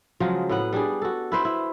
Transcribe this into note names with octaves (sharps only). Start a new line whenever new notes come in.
C#3 F3 F#3 G#3
A2 B3 F#5
G3 D4 G#4
F#4 A4
E4 B4 C5
E4